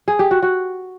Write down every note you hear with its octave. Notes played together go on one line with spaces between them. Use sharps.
G#4
G4
F#4
F#4